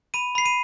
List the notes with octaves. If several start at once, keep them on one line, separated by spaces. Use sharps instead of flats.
B5 D#7
B5 C7
D#7